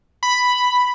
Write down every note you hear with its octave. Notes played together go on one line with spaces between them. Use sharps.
B5